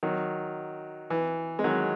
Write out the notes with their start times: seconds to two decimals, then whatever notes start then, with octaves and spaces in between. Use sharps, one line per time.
0.03 D#3 F#3
1.10 E3
1.59 G#3
1.64 D#3 F#3